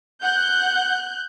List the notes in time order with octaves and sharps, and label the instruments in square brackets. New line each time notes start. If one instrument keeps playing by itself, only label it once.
[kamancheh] F#5 [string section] F#6 G6